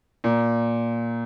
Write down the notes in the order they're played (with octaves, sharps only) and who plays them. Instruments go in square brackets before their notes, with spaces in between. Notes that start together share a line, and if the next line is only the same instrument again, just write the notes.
[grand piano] A#2